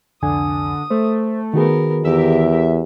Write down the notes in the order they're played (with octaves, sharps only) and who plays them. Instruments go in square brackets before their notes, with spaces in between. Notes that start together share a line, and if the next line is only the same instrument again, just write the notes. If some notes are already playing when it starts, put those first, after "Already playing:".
[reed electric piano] C2 F2 G#5 [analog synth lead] D3 [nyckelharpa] D#6
[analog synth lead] A3 [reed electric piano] C5
[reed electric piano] D#3 F#4 G#4 [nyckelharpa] B3 A#4
[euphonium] E2 [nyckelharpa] G4 A#4 [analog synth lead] E5